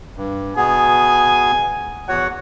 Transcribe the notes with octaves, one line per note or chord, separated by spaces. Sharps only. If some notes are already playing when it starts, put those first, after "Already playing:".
G2
B2 B3 G#4 G#5
E2 F#4 C#5 F#5